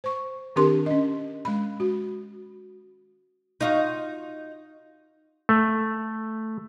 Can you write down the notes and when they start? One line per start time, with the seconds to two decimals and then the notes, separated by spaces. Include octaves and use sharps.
0.04 C5 C#6
0.56 D#3 C4 D4 G4 A#4 C6
0.86 C#4 D#5
1.45 G#3 B5
1.80 F#4
3.61 D#4 F4 F#4
5.49 A3